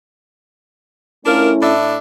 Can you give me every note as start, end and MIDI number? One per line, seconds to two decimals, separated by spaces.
1.26 1.74 57
1.26 1.74 61
1.26 1.50 62
1.26 1.74 64
1.26 1.50 65
1.26 1.50 70
1.61 1.98 45
1.61 1.98 62
1.61 1.98 76